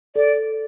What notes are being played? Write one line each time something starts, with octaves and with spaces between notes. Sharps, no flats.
A4 D5